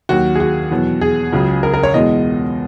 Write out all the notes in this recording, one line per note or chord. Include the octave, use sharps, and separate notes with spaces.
D#2 D#3 F#3 F#4
G#4
F#4
E2 B2 F#3
G#4
C#2 C#3 F#3
A#4
A#4
C#5
E2 B2 G#3 D#5